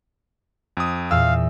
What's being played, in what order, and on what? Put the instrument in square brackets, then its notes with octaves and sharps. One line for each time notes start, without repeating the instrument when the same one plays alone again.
[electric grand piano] F2 D#6
[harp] E2 [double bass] A#2 [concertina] F5 [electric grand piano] E6